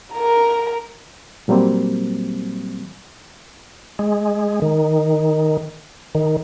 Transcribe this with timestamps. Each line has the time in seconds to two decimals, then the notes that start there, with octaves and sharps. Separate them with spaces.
0.14 A#4 A#5
1.48 A#2 F#3 G3 A#3 C4
3.99 G#3
4.62 D#3
6.15 D#3